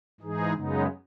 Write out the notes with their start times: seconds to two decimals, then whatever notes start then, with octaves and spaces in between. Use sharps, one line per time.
0.20 G#2 E3 G#3 D#4 G#4
0.54 F#2 C#3 G#3 B3 D#4